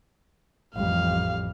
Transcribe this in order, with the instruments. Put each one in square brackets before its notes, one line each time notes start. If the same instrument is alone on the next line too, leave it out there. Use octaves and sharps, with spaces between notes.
[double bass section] A1 F2 G3 [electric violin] F5